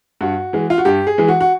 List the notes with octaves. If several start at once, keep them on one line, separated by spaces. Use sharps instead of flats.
G2 F#4
E3 G#3
F4
F#4
G2 G4
G#4
E3 G#3
F#4
F#4